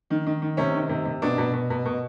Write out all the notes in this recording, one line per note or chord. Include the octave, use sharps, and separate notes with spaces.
D#3
D#3
D#3
C3 C#4
D#3
C3
C3
B2 D4
B2
B2
B2
B2